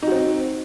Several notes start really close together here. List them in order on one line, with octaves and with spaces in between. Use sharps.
D#4 F#4 C4